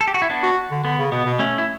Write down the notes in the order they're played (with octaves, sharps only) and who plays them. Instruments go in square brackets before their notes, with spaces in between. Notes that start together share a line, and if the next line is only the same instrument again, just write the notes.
[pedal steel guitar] A4
G4
F#4
E4
B3 D4
[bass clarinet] F#4
D3
[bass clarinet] D3 [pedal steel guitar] B3
[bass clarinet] C#3
[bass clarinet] B2 [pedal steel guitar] B3
[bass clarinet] B2
[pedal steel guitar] A3 C#4
E4